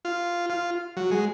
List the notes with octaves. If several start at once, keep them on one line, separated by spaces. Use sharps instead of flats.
F4
F4
F#3
G#3